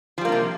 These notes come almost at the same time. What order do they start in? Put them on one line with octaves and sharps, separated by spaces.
F3 G3 A#3 D4 C3